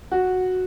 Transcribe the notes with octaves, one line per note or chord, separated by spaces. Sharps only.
F#4